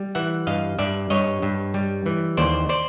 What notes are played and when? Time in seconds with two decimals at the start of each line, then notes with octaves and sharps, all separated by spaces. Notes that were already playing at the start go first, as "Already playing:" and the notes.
Already playing: G3
0.15 E3 E5 F#5
0.47 G2 D#5 F5
0.79 G2 D5 E5
1.10 G2 C#5 D#5
1.42 G2
1.74 G3
2.06 E3
2.37 D#2 C5 D5
2.69 C5 D5